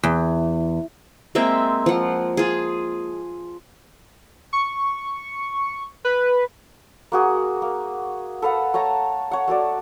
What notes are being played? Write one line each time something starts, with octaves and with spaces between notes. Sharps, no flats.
E2
G#3 A#3 C4 E5
F3 F#5
F4 G#4
C#6
B4
A#3 F#4 G#4
A#3
A4 B4 F5 F#5
A3 C#5 A5 A#5
C#5 F#5
A3 F#4 A4 D5